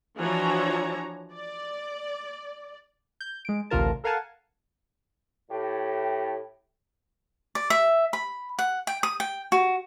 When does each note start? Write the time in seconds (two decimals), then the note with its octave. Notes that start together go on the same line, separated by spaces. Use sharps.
0.18 E3 F3 D4 F#4 C#5 A#5
1.33 D5
3.21 G6
3.45 G#3 D7
3.70 A1 D2 C3 F4 A#4 A5
4.04 A4 A#4 F5 F#5 G#5 A5
5.50 A2 G4
7.55 D5
7.70 E5
8.13 B5
8.59 F#5
8.87 G5
9.03 D#6
9.20 G5
9.52 F#4